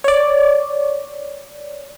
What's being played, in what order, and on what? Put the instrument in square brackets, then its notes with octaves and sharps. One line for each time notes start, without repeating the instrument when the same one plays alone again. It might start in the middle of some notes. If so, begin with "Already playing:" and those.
[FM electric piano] C#5 D5